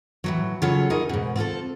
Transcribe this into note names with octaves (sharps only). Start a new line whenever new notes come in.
A2 E3 F#3
C#3 F#3 F4 A4 C#5
D#4 G#4 A#4 D#5
G#2 B2
C4 F4 G#4 A4